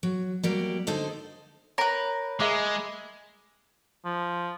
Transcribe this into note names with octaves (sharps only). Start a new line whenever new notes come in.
F#3
F#3 G3 A#3
D3 D#4 A4 C5
A#4 B4 C#5
G#3 G#4 D#5 E5 D6
F3